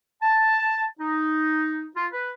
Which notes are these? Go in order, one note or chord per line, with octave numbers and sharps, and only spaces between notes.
A5
D#4
F4
B4